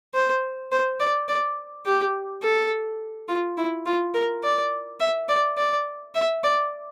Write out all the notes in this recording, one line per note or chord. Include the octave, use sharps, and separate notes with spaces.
C5
C5
D5
D5
G4
A4
F4
E4
F4
A#4
D5
E5
D5
D5
E5
D5